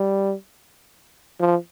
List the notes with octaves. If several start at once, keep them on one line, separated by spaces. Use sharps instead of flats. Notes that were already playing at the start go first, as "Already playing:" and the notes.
Already playing: G3
F3